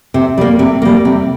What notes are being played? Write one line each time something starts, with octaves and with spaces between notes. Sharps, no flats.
C3
G3 A#3
C3
G3 A#3
C3